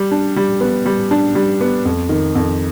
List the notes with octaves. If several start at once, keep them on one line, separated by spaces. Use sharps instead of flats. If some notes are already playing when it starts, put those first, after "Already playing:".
Already playing: G3
D4
G3
B3
G3
D4
G3
B3
F2
D#3
F2